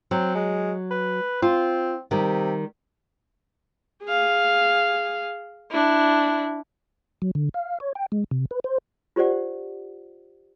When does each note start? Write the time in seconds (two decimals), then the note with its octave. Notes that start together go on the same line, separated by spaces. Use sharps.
0.11 F#3 C4
0.35 G#3
0.91 B4
1.42 C4 F4
2.11 C3 D#3 G3
4.04 G#4 F5
5.72 D4 E4
7.22 F#3
7.35 D3
7.54 F5
7.80 C#5
7.95 G5
8.12 G#3
8.31 C3
8.51 B4
8.64 C5
9.16 F4 G4 C5 D5 F#5